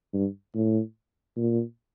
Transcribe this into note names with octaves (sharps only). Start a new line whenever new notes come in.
G2
A2
A#2